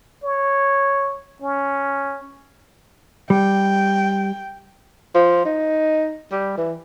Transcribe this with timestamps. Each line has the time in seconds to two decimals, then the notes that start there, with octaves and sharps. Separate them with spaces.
0.23 C#5
1.42 C#4
3.30 G3 G5
5.15 F3
5.45 D#4
6.32 G3
6.58 E3